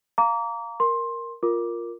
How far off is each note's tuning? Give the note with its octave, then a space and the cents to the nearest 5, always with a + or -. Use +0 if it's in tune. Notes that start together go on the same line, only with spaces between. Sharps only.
F5 +0 A#5 -5 D6 -35
A#4 +0 C6 +15
F4 +0 A#4 +0 D6 +0